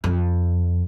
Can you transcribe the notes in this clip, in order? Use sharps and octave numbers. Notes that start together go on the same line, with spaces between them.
F2